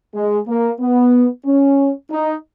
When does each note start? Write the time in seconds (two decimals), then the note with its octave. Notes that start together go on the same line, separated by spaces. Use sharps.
0.15 G#3
0.48 A#3
0.80 B3
1.45 C#4
2.11 D#4